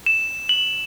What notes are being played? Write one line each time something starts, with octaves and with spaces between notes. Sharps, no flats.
E7
F#7